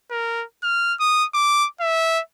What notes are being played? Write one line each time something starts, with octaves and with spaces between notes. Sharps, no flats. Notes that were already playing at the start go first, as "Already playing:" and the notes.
A#4
F6
D#6
D6
E5